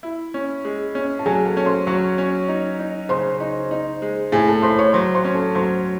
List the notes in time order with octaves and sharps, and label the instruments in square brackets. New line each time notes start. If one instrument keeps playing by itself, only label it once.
[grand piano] E4
C#4
G#3
C#4
[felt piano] A5
[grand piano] F#3 [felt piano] G#4 G#5
[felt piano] A4 A5
[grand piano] C#4
[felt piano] C5 C6
[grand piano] F#3 [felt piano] C#5 C#6
[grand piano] C#4
D#4
D#4
[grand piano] C#3 [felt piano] C5 C6
[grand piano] D#4
D#4
G#3
[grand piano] A2 [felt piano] G#4 G#5
[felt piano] A4 A5
[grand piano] A2 [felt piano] C5 C6
[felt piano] C#5 C#6
[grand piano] F#3 [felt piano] C5 C6
[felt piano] C5 C6
[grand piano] C#4
[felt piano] A4 A5
[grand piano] F#3 [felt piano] C5 C6